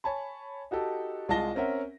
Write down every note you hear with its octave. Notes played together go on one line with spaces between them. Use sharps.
C#5 G#5 A5 B5
D#4 F#4 G4 A4
C2 G#3 F4 A5 A#6 G7
C4 C#4 A#4 E5 F#5